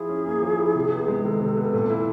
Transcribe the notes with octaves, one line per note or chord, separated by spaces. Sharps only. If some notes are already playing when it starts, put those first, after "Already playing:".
Already playing: F3 E4 F4 G#4
C#4
A#3
F3
E4
C3
B3
G#3
D#3 A4
C3
B3
A#2
E4